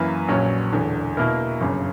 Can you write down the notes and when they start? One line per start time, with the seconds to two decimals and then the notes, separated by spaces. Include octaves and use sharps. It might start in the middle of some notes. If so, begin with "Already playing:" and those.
Already playing: F#2 E3 A#3 E4 B4
0.28 A#1 A#2 F#3 C#4
0.72 E1 E2 D3
1.17 B2 A#3 E4 A#4
1.61 G1 F#2 C#3